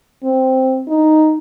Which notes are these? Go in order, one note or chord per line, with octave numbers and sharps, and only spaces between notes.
C4
D#4